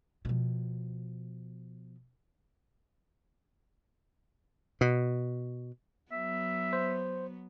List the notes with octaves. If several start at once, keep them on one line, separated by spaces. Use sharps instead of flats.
B2 F3
B2
F#3 B3 E5
C5